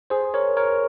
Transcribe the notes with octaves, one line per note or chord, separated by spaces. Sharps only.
G#4 C5
A#4 C#5
A#4 C#5